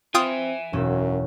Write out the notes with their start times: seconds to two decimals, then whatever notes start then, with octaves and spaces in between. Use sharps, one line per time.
0.14 C4 F4 E5 G5 G#5 D#6
0.73 E1 F#2 C#4 E6